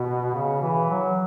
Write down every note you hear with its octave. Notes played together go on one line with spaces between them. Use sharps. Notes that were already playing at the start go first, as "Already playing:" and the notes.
Already playing: B2
C#3
E3
F#3